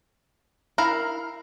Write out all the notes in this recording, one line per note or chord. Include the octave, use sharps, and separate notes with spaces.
E4 A#4 F5 A#5